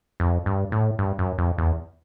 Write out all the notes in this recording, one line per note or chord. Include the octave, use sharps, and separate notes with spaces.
F2
G2
A2
G2
F#2
F2
E2